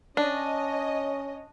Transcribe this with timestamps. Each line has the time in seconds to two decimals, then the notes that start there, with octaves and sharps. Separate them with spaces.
0.17 C#4 D4 C#5 D#5